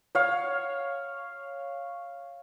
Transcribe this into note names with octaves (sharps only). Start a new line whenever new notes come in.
C#5 F5